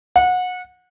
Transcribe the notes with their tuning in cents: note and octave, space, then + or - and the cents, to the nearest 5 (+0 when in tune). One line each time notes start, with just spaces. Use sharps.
F#5 -25